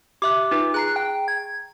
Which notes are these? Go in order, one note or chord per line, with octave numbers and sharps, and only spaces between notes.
G4 E5 D6 F#6
D#4 F4 B4
G#4 A#5 F#6 C7
G5
G#6